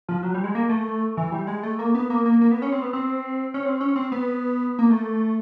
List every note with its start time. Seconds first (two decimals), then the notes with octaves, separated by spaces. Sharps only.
0.08 F3
0.23 F#3
0.34 G3
0.44 G#3
0.55 A#3
0.69 A3
1.17 E3
1.32 G3
1.47 G#3
1.63 A3
1.79 A#3
1.95 B3
2.10 A#3
2.26 A#3
2.41 A#3
2.51 B3
2.62 C#4
2.72 C4
2.82 B3
2.93 C4
3.54 C#4
3.65 C4
3.80 C#4
3.96 C4
4.12 B3
4.79 A#3
4.90 A3